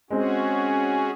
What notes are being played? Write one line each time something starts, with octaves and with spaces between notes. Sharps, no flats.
G#3 C4 C#4 F#4 G#4